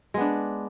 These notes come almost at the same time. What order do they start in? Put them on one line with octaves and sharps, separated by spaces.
G#3 B3 D4